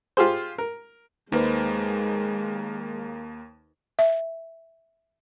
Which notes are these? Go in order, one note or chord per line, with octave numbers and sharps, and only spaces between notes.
F4 G4 G#4 C5
A#4
D#2 G#3 A#3 D#4 B4 C5
E5